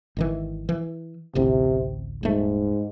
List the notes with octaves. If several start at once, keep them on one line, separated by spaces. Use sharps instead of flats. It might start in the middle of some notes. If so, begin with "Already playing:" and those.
G#1 D#3 E3
E3
A1 D2 C3
D#1 G#2 A3